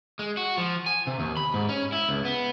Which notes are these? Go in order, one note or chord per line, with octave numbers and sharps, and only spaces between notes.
G#3
F#4
F3
G#5
C3
D#2
B5
G#2
C#4
E4
C#2
B3